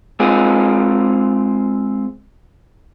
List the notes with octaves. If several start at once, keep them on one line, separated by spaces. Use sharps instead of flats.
G#3 C4 F4 G#4